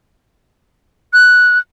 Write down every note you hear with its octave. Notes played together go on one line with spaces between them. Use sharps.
F#6